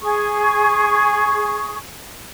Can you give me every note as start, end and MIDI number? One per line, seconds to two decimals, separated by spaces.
0.01 1.77 68
0.01 1.77 85